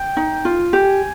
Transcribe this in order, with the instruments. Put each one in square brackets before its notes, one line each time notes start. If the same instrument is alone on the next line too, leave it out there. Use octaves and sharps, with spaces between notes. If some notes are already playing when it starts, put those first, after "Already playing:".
Already playing: [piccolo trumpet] G5
[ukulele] D#4
F4
[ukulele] G4 [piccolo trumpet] G#5